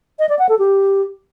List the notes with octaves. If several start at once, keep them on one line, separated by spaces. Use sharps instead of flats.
D#5
D5
F#5
A4
G4